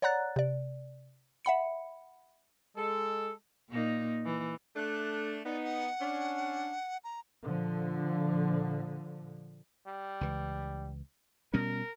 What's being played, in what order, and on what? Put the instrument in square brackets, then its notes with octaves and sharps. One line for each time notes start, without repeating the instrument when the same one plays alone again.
[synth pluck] C#5 D5 F#5 A#5 F#6 A6
C3 D5
E5 F#5 B5 C#7
[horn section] G#3 A4
[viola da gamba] A#2 A#3 D#4
E3
[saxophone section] A3 D4 [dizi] F#6
[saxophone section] B3 D#4 [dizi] D5
[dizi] F#5
[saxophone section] C#4 D4
[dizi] A#5
[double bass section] A#2 D3 F3
[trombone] G3
[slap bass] C#2 E3
[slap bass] B2 G3 C#4 [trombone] A#4